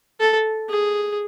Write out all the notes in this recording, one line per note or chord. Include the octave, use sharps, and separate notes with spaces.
A4
G#4